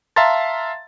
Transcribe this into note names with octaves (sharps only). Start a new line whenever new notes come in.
E5 F5 A5 A#5 C6 A6